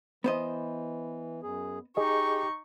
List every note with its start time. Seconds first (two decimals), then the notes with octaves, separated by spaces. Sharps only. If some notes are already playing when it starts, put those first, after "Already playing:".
0.24 E3 B3 C5 D#5
1.43 F#2 G#4
1.97 D#4 G4 G#4 D#5 C#6